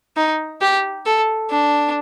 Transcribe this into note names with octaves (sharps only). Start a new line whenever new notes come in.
D#4
G4
A4
D4